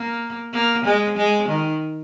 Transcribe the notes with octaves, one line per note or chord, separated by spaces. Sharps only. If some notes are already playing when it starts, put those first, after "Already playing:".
Already playing: A#3
A#3
G#3
G#3
D#3